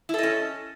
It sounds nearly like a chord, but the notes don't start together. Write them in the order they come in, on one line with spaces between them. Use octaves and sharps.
E4 A4 D#5 C#4